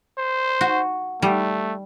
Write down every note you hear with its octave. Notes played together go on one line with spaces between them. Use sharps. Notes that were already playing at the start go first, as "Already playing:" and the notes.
C5
F#4
G3 A3